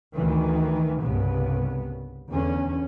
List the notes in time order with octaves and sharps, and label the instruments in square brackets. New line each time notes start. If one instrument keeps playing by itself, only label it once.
[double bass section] D2 D#3 E3
C2 G2 C#3 B3
E2 D3 C#4